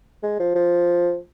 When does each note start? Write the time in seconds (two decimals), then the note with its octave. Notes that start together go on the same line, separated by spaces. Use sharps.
0.23 G#3
0.40 F3
0.55 F3